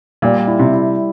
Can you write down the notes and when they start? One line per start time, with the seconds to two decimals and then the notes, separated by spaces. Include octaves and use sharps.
0.22 A#2 G3
0.47 E4
0.59 C3
0.73 E4